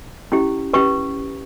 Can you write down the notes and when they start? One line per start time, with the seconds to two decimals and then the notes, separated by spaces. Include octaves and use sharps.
0.32 C#4 E4 G4
0.73 C#4 G4 B4 C#6